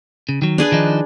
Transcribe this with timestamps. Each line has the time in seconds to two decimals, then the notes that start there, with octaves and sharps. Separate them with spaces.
0.29 C#3
0.42 D#3 F#3
0.58 D4 G#4 B4
0.72 D#3 F3 D#4